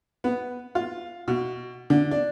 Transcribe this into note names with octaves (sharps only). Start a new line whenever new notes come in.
B3
F4
B2
D3
D4